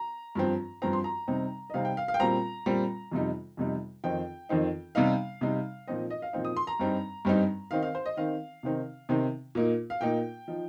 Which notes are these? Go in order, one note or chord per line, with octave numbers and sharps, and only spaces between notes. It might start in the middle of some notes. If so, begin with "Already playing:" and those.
Already playing: A#5
G2 F3 C4
G2 F3 C4 A#5
C6
A#5
C3 G3 C4 D#4
D#5
C3 G3 C4 D#4 F5
G5
F5
F5
G5
A#2 G3 C4 A#5
A#2 G3 C4
F2 C3 G3 D#4
F2 C3 G3 D#4
F2 D#3 C4 D#4 G5
F2 D#3 C4 D#4
C3 G3 D#4 F5
C3 G3 D#4
A#2 F3 C4 D#4 D#5
D#5
F5
A#2 F3 C4 D#4
D#6
C6
A#5
G2 G3 C4 D#4
G2 G3 C4 D#4
D#3 C4 D#4 F5
F5
C5
D#5
D#3 C4 D#4 F5
C3 D#3 C4 D#4
C3 D#3 C4 D#4
A#2 A#3 D#4
F5
A#2 A#3 D#4 G5
F3 D#4